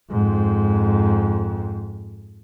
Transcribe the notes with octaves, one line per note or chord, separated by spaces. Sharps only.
F2 G#2